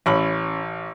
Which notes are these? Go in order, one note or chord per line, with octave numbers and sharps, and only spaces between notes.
A1 C#4 B5